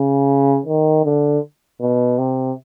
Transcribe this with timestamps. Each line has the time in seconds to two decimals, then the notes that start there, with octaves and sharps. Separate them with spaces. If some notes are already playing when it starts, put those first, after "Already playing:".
Already playing: C#3
0.66 D#3
1.04 D3
1.81 B2
2.18 C3